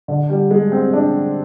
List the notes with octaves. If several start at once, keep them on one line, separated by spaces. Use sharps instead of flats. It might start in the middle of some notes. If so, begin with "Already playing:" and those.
D3
G3
G#3
C4
D4